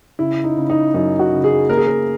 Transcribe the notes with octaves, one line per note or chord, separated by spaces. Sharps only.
C#3 E4
D#4
C#3
D#4
F#2 D#4
F#4
C#3
G#4
A#3 A#4
G#4
A#4